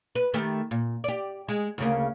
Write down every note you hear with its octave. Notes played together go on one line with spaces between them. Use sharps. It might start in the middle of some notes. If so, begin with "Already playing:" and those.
B4
D#3 A3 G4
A#2
G4 D5
G#3
D2 C#3 A#3